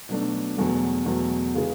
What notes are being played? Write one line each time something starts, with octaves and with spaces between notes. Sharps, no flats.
B2 F#3 A3 D4
E2 B2 F#3 A3
E2 B2 F#3 A3
C#3 E3 G#3